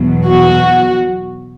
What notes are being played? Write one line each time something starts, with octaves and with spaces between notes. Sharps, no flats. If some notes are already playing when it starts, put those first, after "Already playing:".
Already playing: E2 B2 F#3
F#4